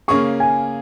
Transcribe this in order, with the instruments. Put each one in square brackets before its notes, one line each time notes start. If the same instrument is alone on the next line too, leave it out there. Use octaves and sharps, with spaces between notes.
[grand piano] C#3 A#3 C#4 G#4 [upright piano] C#6
[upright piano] G#5